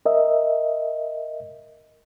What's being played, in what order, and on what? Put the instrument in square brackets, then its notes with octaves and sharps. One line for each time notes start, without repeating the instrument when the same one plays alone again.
[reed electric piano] A#4 D#5 E5